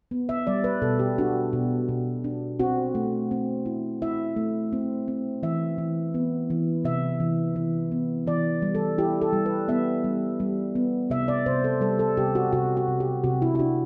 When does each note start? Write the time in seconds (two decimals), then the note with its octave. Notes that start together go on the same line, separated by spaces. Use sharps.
0.11 B3
0.29 E5
0.47 G3 D5
0.64 B4
0.82 B2 A4
0.99 G4
1.18 D4 F#4
1.53 B2
1.89 B2
2.24 D4
2.60 C4 F#4
2.95 A3
3.31 C4
3.66 E4
4.02 E4 E5
4.36 A3
4.72 C4
5.08 C4
5.43 E3 E5
5.78 E3
6.14 B3
6.50 E3
6.85 C3 E5
7.20 E3
7.56 E3
7.92 B3
8.27 E3 D5
8.62 G3
8.75 A4
8.98 E4 G4
9.21 A4
9.33 G3
9.46 B4
9.68 B3 E5
10.04 G3
10.40 G3
10.75 B3
11.10 C3 E5
11.28 D5
11.46 C3 C5
11.64 A4
11.81 G3 A4
11.99 A4
12.17 C3 G4
12.35 F#4
12.53 C3 F#4
12.77 F#4
12.88 C3
13.00 G4
13.24 C3 F#4
13.42 E4
13.55 E4
13.59 D4 F#4